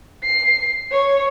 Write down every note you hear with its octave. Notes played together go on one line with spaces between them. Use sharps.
C7
C#5